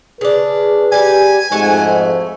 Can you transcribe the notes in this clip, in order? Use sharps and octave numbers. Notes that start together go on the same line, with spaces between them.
C#3 D4 G#4 B4
G3 G4 G#5
F2 G#2 A3 F#4